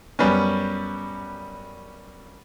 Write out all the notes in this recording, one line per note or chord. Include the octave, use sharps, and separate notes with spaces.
F#2 G3 B3 C#4